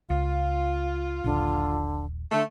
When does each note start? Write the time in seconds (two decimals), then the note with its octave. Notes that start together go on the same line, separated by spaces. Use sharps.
0.10 C#2 F4 F5
1.24 D#1 A#1 D3
2.32 D3 A3